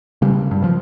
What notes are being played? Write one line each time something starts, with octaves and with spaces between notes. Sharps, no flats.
C#3 G3
G2
F3